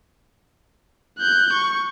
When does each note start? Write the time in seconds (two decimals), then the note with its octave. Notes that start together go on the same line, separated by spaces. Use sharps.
1.18 F#6 G6
1.53 C#6